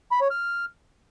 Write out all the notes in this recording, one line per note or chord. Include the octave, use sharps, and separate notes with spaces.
B5
C#5
F6